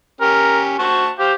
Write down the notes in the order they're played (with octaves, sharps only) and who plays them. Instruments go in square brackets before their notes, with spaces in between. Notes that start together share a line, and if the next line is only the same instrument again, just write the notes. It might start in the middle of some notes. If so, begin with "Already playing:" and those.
[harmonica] C#4 G4 [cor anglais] A#4
[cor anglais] F#4 [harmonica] C5 A5 C#6
[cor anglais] G4 [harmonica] C5 F5